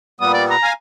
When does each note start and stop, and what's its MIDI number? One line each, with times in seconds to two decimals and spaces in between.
0.20 0.56 46
0.20 0.56 55
0.20 0.56 59
0.20 0.31 87
0.34 0.44 74
0.50 0.70 82
0.63 0.73 77
0.63 0.73 80